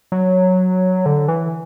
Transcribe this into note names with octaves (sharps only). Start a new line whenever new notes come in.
F#3
D3
E3